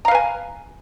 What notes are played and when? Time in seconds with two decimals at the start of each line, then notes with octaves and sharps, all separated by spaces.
0.05 A#5
0.08 F5
0.11 B4
0.15 G#5